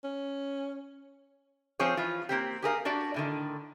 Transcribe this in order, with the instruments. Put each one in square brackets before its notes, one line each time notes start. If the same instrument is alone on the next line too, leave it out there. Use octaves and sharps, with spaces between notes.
[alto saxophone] C#4
[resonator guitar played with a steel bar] F3 C4 G#4 C#5
E3 F3 F4
A#3 C4 G4
G4 G#4 A#4 F5
D4 F#4 G4 D5
A2 D3 D#3